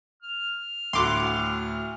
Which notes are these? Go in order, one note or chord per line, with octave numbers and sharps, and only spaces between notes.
F6
D2 A2 F#4 C6 D6